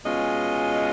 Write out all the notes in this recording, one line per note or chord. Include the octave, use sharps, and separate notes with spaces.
B2 G#3 C#4 F4 D#5